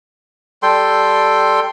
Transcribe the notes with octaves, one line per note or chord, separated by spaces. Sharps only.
G3 A4 G5 C6